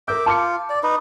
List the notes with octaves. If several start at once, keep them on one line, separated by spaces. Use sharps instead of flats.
A#4 E5 D6 G6
F4 A5 D6 C#7
D5
D#4 B4